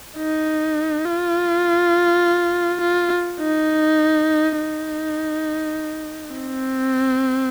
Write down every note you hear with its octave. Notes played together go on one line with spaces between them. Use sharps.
D#4
F4
F4
D#4
D#4
C4